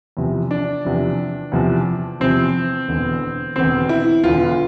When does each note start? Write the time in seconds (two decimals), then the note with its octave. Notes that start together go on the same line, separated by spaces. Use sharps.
0.17 E2 C3 F3
0.51 D4
0.85 E2 C3 F3
1.52 E2 C3 F3
2.20 E2 C3 F3 C4
2.88 E1 E2 D3
3.56 E1 E2 D3 C4
3.89 E4
4.24 E1 E2 D3 F4